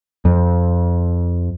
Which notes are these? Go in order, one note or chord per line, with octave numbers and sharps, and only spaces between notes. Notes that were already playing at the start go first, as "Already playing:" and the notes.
F2